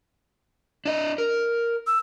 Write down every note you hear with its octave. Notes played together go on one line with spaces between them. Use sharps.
D4 D#5
A#4
E6